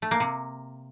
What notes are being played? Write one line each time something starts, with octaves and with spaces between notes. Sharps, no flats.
A3
A#3
C3